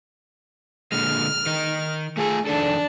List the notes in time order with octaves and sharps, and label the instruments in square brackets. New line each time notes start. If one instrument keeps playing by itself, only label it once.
[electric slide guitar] A#2 D3 G#3 [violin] F6
[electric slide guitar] D#3 D#4
[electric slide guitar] A3 F4 A4 [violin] G#4
[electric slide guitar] F2 D#3 A4 [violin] D4